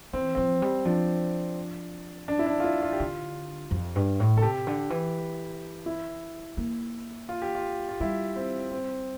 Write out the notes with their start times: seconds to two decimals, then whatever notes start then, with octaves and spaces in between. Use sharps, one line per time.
0.13 E3 C4
0.35 F3 C4
0.62 G3
0.85 F3 D4
2.28 D4
2.39 E4
2.46 D4
2.60 F4
2.64 E4
2.82 F4
2.93 G4
3.00 D3 F4
3.71 F2
3.96 G2
4.20 A2
4.36 D3 A4
4.42 C3 G4
4.67 D3
4.90 E3
5.86 E4
6.57 A#3
7.29 F4
7.42 G4
7.55 F4
7.89 F4
8.00 G3 E4
8.36 C4
8.72 C4